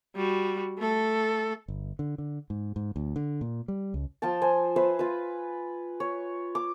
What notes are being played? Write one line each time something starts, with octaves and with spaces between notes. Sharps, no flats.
G3 F#4
A3 A4
G1
D3
D3
G#2
G#2
D2
D3
A#2
G3
C#2
F3 F4 G5 A5
C5 G#5
B4 C5 E5
F4 B4
C#5
D6